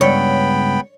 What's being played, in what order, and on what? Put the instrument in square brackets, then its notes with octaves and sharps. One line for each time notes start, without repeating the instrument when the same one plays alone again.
[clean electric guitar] C#2 G2 [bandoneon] B3 G5 B5 [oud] C#5